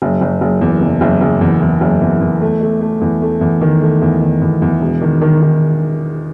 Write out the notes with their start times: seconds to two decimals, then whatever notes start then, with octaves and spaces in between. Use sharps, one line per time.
0.02 F#1
0.21 F#1
0.41 F#1
0.61 E2
0.81 F#1
1.01 F#1
1.21 F#1
1.41 E2
1.62 E2
1.81 F#1
2.01 E2
2.21 E2
2.42 A3
2.61 A3
2.81 A3
3.01 E2
3.22 A3
3.41 E2
3.61 D#3
3.82 A3
4.02 E2
4.21 D#3
4.41 E2
4.62 E2
4.81 E1
5.01 D#3
5.21 D#3
5.42 D#3